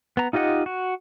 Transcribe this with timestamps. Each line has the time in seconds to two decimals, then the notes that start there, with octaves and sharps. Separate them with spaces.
0.17 B3 A#5
0.33 D#4 F4 G4 D#5 F#5
0.66 F#4